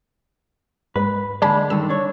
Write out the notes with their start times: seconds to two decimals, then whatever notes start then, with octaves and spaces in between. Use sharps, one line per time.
0.96 G#2 B4
1.42 D3 G#3 D5 A5 B5
1.70 G2 D3 D#3 E6
1.89 D4 C#5